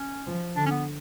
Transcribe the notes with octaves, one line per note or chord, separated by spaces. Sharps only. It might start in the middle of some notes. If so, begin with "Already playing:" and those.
Already playing: C#4
F3
D3 D4
C#4
B3